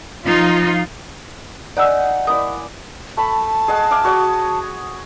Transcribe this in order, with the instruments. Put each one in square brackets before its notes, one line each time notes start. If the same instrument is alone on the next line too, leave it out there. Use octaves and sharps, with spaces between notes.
[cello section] F3 D#4 F4
[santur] D#4 F#5 G#5 [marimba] D5 E6
[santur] A#3 E4 D5 [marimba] D#6
[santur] A3 B5 [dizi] A5
[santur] G#4 D#5 F#5
E5 F5 D6
F#4 C#5 D#6